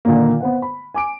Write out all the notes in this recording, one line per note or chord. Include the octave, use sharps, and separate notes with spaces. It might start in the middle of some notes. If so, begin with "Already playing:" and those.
A#2 D3 D#3 A#3
B3 C5 F#5
B5
G#5 D6 D7